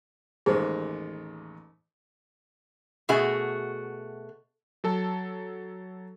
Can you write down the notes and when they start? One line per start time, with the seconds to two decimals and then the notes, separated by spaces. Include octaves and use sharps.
0.46 A1 D#2 G#3 G#4 C5
3.09 B2 A3 F#4 G#4
4.84 F#3 A4 A5